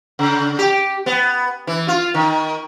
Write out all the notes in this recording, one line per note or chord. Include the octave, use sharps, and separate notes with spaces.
C#3
G4
B3
E3
F4
D#3